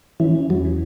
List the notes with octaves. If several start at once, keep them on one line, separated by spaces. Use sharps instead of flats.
E3 C#4
C#4
E2 F#3
E3